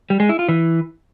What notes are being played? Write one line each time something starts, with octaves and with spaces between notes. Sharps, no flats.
G3
G#3
E4
F4
E3